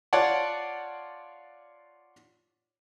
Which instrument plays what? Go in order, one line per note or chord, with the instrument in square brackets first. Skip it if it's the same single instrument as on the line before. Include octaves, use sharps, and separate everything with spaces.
[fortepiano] F4 C#5 D5 F#5 A5